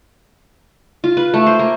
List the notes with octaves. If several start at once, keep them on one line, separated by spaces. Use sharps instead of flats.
F4
B4
A3
C5
A#3